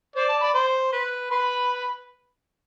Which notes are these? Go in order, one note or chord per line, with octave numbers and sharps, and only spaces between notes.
C5 D5
A5
D5 B5
C5
B4
B4 B5 C6